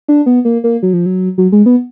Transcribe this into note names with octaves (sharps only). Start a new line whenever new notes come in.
D4
B3
A#3
A#3
F#3
F3
F#3
F#3
G#3
B3